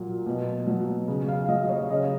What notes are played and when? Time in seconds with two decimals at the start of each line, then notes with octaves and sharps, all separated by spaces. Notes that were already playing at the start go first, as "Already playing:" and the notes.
Already playing: A#2 F#3
0.26 B2
0.67 F#3
1.08 C#3
1.29 F5
1.49 F#3 D#5
1.64 D#5
1.69 C#5
1.82 F5
1.90 C#3 D#5